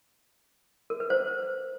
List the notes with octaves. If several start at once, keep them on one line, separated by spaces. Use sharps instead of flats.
A#4
B4
C5